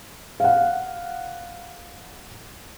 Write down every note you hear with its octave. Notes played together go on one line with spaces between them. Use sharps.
F5 F#5